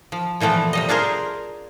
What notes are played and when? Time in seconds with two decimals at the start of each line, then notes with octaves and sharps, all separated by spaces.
0.12 F3
0.40 A#2 E3 F3 A3 B3
0.73 C3 G3 D#5
0.89 D4 F4 G#4 A#4 C5